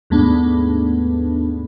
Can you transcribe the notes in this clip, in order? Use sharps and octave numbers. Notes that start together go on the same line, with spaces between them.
D#2 G#2 A3 B3 D4